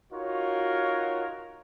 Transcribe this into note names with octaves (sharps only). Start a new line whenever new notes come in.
D#4 F4 F#4 A#4 C#5